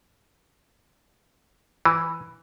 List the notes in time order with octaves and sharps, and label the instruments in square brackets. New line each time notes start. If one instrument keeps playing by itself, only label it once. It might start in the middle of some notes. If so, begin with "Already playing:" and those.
[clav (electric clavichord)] E3